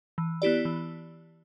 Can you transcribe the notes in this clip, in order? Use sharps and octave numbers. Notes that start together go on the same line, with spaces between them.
E3
B3 E4 G4 D5
E3